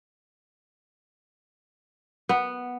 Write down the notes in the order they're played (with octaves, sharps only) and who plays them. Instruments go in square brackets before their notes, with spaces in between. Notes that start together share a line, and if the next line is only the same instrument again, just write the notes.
[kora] B3